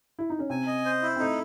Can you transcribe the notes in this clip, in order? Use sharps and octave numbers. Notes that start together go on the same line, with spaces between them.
E4
D#4
C#4
C3 C4 G#5
D#5
C5
E4
C4
A3 D#4